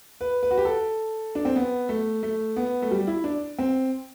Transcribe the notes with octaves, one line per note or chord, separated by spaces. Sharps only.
B4
B4
F#4
G4
A4
D4
C4
B3
A3
A3
B3
A3
G3
E4
D4
C4